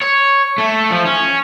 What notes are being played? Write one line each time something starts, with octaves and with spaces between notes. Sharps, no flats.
C#5
A3
F3
C#4